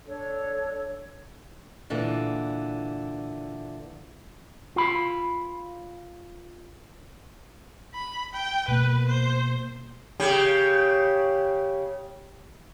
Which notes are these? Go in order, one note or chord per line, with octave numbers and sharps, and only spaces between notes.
D4 A4 C#5
A#2 D3 E3
F4 B5
B5
G5
B2 A#3 B4
C5
C#3 G4